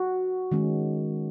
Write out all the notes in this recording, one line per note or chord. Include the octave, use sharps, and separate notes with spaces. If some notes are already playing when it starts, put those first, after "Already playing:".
Already playing: F#4
D#3 G#3 C#4